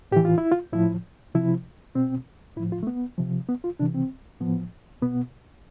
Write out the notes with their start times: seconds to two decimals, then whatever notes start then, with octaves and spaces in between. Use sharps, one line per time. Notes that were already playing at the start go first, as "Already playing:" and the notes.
0.11 A2 E3 G4
0.25 F4
0.38 E4
0.52 F4
0.72 A2 F3 E4
1.35 C3 F3 E4
1.95 B2 C4
2.56 A2 E4
2.60 F3
2.72 F4
2.83 A3
2.87 B3
3.18 C3 F3
3.49 B3
3.64 F4
3.79 C3 E3 D4
3.95 C4
4.40 A2 F3 B3
5.02 B2 B3